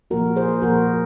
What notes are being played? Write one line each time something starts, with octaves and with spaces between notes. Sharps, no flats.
A#2 F3 A#3 F#4 A#4
G#4 C5
A#2 F3 A#3 F#4 A#4